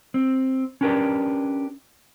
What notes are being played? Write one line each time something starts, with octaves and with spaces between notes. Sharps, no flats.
C4
C#4 D4 G4 A#4 B4 D5